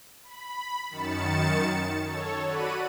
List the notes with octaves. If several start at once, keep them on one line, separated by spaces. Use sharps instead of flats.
B5
F#2 D#3 A6 C#7 E7
A4 C#5
F#4 D5 F#5 B5 D#7